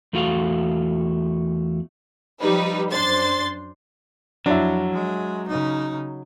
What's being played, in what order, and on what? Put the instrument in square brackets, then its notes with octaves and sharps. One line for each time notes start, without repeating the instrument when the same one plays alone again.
[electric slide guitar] E2 A3 F4 F#4 F5
[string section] F3 G3 D#4 B4
F#2 D4 C5 C6 A6
[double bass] F2 [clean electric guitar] F#3 [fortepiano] D4 E4
[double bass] G#3
C#3 D#4